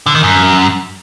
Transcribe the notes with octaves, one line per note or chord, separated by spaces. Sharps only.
D3
D#3
F#2